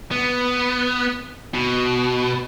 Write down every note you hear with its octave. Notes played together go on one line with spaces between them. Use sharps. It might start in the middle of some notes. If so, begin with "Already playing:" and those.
B3
B2